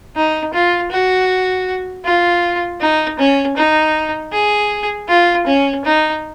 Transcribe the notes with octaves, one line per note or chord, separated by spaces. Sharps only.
D#4
F4
F#4
F4
D#4
C#4
D#4
G#4
F4
C#4
D#4